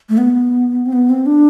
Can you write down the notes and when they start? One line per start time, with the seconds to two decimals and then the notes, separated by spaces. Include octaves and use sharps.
0.09 A3
0.18 B3
0.86 C4
0.93 B3
1.10 C4
1.26 D4